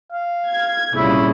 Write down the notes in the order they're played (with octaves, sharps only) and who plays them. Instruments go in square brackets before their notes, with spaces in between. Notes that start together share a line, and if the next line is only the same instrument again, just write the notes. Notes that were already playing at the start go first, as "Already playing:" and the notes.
[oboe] F5
[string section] G#6
[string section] C2 A#2 C#3 [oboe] E4